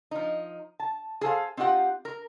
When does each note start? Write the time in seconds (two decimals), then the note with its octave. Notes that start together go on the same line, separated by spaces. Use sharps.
0.11 F3 D#4
0.80 A5
1.21 G#4 A4 C5 F5
1.57 C4 D#4 F4 G4 F#5
2.05 A#4